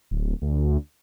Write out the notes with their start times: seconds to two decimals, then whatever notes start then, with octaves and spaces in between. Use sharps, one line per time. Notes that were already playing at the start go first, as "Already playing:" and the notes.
0.11 D1
0.42 D2